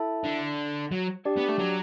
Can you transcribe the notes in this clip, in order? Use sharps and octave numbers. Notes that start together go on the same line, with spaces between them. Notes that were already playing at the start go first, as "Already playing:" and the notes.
Already playing: E4 A4 E5 A5
D3
F#3
D4 G4 D5
B3
A3
F#3